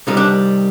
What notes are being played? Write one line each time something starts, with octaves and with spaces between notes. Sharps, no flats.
C2 C3 D#3 G3 D#4
D4